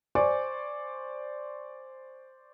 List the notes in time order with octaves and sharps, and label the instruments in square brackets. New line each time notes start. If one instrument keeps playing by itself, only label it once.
[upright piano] C5 D5 G#5 C#6 D6